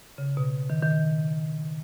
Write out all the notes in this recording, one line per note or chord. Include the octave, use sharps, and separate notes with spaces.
C#3
B2
D#3
D#3